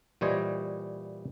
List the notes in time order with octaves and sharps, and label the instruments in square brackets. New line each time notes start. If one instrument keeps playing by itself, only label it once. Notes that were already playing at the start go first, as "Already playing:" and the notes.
[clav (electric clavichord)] A#2 E3 G3 C5 C#5 D#5